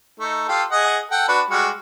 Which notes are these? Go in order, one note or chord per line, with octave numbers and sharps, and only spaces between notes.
A3 D#4
F4 G4 A4
G#4 D#5 F#5
A4 F#5 G5
D4 F#4 B4
G3 G#3 F#4